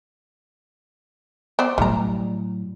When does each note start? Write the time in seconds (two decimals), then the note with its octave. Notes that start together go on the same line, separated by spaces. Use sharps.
1.59 B3 C5 D5
1.78 A2 F#3 G3 A#5